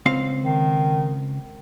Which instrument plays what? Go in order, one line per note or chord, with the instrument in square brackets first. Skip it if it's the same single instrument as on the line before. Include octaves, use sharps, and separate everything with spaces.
[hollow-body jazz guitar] C#2 C4 F5
[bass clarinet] D#3